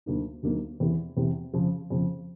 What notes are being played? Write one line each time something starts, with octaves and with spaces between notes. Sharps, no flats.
D2 D3 F#3 A#3 D#4
D2 D3 F#3 A#3 D#4
E2 C3 E3
E2 C3 E3
F2 C#3 F3
F2 C#3 F3